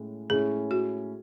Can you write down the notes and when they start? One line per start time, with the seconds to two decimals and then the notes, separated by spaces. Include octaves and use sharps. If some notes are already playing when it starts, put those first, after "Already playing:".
Already playing: A2 G#3 C#4 E4
0.30 A2 G#3 C#4 E4 G#4
0.71 F#4